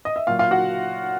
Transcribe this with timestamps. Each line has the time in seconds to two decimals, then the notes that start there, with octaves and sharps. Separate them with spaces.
0.05 D#5
0.16 E5
0.27 A#2 F#3 F4 F5
0.39 F4 F5
0.51 F#4 F#5